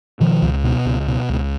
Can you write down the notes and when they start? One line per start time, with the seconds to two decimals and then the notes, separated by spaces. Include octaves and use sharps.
0.20 B2 D#3 F3
0.42 C#2
0.64 B2
0.86 C#2
1.08 B2
1.29 C#2